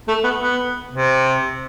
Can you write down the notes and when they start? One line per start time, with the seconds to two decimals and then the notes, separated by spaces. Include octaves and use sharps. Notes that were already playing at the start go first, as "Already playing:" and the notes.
0.08 A3
0.24 B3
0.41 B3
0.91 C3